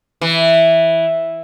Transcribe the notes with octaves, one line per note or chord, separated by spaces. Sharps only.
E3